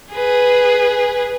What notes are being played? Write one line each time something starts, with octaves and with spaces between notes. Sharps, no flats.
G#4 B4